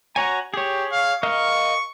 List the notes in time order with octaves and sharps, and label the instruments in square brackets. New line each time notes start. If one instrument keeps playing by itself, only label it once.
[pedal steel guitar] F#4 C#5 G#5 [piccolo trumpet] A#5
[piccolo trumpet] G4 [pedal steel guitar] G#4 C#5
[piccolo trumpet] F5
[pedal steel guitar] A#4 D#5 F5 [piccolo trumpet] C#6